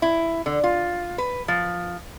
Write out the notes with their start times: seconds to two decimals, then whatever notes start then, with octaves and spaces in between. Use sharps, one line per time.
0.02 E4
0.46 D3
0.64 F4
1.18 B4
1.48 F3